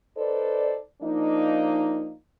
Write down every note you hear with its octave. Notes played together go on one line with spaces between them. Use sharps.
D#4 A4 B4 C5 D5
F3 A#3 D4 D#4